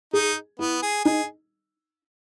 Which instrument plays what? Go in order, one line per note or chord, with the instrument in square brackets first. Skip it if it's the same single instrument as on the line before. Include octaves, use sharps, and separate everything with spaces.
[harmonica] D#4 [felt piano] G#4
[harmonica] B3 [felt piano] E4
[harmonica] G#4
[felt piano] D#4 [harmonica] G#4